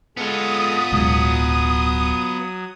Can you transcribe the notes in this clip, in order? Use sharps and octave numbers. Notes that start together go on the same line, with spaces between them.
G#3 B3 F4 A4 D#6
D1 B1 F#3 G#3